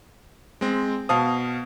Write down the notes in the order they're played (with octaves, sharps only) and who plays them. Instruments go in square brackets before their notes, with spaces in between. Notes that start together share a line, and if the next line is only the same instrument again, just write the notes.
[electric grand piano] G#3 C4
[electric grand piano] B2 F5 D#6 [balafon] C5 A5